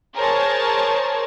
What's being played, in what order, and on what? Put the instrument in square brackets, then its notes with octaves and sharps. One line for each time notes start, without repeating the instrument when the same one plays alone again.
[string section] G#4 A#4 C5 C#5 A5